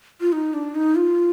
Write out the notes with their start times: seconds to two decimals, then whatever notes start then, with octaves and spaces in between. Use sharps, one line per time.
0.21 F4
0.32 D#4
0.54 D4
0.75 D#4
0.95 F4